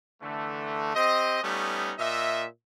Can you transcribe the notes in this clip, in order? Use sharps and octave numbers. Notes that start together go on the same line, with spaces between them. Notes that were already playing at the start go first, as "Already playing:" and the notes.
D3 E3 A3
C4 G4 D#5
G3 A3 B3 C#4 D#4
A#2 D#5 E5